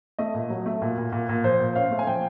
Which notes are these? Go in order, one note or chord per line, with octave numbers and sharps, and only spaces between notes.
A3 D#5
A#2
F#3
A3
A#2
A#2
A#2
A#2
F3 C5
A#2
C#4 F5
A3
G#5
F3 G5